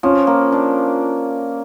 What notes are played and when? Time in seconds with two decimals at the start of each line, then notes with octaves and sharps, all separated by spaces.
0.03 F3 C#4
0.27 A#3
0.52 D4